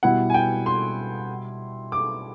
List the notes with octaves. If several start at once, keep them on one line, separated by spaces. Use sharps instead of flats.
B2 G3 B3 E4 F#5
G#5
G5
C6
D6